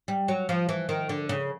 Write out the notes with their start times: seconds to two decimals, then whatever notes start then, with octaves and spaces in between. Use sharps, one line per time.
0.08 G3
0.28 F#3
0.49 F3
0.69 E3
0.89 D#3
1.09 D3
1.29 C#3